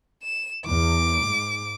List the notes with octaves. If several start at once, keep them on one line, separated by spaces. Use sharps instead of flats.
E7
E2 D6
G#2